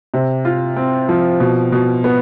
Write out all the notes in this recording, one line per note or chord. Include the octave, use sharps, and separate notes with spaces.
C3
F4
C4
F3
B2
B2
B3